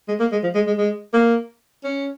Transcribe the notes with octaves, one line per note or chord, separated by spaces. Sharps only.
G#3
A#3
G#3
F3
G#3
G#3
G#3
A#3
C#4